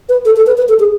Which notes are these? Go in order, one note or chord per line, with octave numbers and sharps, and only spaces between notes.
B4
A4
A4
B4
B4
A4
G#4